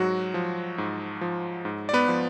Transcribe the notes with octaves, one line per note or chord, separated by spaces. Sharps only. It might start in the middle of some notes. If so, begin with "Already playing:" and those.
Already playing: G#2 F#3 F#4
F3
G#2
F3
G#2
D5
B3 B4
F3